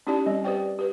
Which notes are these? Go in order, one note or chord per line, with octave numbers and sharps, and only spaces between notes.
C#4 D#4 E4 G4 D5 A5
G3 C4
G4 B4 C5 D5 G5
G4 B4